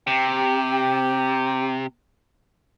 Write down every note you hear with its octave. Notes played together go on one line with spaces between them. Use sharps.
C3 G4